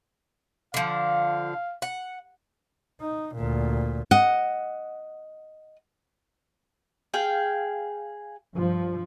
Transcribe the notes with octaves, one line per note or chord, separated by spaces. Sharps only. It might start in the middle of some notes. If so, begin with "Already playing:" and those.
D3 F3 F5
F#5
D#4
D2 A#2
D#5 F#5
G#4 F5 G5
G2 F3